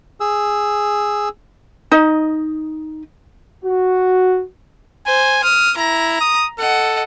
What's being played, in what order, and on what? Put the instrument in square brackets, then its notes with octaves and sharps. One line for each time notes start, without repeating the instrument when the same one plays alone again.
[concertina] G#4 E6
[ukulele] D#4 D#5
[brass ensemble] F#4
[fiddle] C5 [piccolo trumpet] G#5
[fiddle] D#6 [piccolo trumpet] F6
[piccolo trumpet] E4 [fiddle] A#5
[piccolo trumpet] D#6
[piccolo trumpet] A4 [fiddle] D#5 F#5